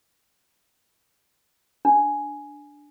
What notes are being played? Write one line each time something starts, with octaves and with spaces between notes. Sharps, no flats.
D4